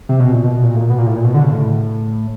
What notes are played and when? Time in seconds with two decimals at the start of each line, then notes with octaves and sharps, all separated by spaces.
0.09 C3
0.20 B2
0.32 A#2
0.44 B2
0.63 A#2
0.75 A2
0.80 A#2
0.90 B2
0.98 A#2
1.06 A2
1.16 A#2
1.24 B2
1.34 D3
1.43 C#3
1.51 A2